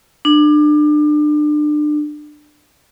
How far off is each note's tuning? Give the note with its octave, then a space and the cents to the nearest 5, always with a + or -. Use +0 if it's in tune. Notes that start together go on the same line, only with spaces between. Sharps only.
D4 +30